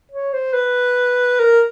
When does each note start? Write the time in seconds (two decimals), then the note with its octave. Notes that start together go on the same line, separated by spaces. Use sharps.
0.12 C#5
0.33 C5
0.53 B4
1.39 A#4